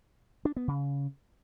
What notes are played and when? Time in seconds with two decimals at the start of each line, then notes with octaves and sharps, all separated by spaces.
0.45 D4
0.56 B3
0.68 C#3